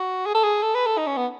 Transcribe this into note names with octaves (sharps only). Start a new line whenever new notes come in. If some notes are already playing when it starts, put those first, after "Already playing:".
Already playing: F#4
G#4
A4
G#4
A4
B4
A4
D#4
C#4
B3